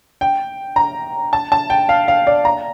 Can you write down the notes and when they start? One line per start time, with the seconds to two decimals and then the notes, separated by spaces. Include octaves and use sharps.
0.21 G5
0.76 A#5
1.33 A5
1.52 A5
1.70 G5
1.89 F5
2.08 F5
2.27 D5
2.45 A#5